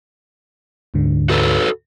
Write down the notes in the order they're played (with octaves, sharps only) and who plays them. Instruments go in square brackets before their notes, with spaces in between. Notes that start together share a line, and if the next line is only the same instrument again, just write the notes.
[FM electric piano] D2 G#2 D3
[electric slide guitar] F#4 A4 B4